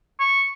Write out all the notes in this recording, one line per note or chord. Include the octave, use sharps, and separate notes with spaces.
C#6